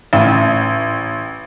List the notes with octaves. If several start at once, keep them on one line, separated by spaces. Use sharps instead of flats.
A1